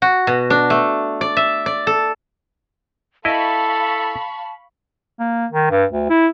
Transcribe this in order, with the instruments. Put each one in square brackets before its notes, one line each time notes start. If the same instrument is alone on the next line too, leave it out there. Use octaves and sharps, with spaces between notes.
[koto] F#4
B2
D4
A3
D5
E5
D5
A4
[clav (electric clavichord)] E4 D#5 [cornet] A4 [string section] F5 B5 C#6 [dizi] A5
[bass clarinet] A#3
D#3
G2
D2
E4